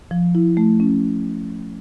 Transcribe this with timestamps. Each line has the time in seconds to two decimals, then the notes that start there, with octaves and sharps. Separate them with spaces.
0.11 F3
0.35 E4
0.57 A3
0.80 C#4